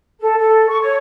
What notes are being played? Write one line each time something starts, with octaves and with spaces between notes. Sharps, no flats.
A4
A4
C#6
C#5